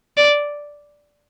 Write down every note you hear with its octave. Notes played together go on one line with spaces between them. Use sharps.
D5